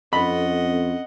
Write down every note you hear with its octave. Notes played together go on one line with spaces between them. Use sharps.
F2 C4 C#4 A4 D#5 F#5 B5